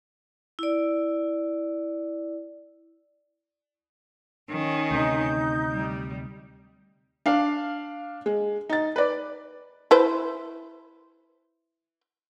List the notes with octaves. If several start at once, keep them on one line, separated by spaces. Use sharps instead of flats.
E4 D5
D#3 C#4
D2 C3 D#4 G6
G3
D4 F5
G#3
D#4 A6
B4 D5
E4 B4 C5